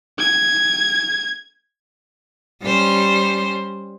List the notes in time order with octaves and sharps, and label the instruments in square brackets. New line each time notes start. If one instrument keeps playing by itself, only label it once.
[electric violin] G#6
[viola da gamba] G3 C#4 C5